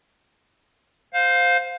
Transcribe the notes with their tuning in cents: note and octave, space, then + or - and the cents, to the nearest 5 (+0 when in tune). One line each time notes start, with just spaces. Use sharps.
C5 -10 F5 +20